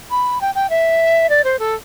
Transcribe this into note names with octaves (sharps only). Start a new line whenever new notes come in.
B5
G5
G5
E5
D5
C5
A4